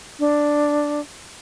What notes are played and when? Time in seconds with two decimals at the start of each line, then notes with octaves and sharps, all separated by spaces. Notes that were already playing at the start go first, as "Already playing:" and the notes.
0.19 D4